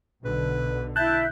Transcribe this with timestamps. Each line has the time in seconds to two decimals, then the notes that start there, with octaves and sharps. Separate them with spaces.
0.25 B1 B2 D3 B4
0.96 E4 E5 A5 F#6 G6